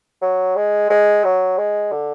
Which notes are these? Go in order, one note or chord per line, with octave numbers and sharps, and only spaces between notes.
F#3
G#3
G#3
F#3
G#3
D3